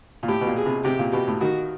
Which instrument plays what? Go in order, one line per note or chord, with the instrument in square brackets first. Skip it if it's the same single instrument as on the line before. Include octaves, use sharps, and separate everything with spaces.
[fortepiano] A#2
[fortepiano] A2 [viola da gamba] G4
[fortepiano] B2
A#2
[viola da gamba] G#4
[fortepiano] C3
[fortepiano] C3 [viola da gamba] G4
[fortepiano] A#2
[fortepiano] B2 [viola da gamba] G4
[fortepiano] A2
[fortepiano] D#3 [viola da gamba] F#4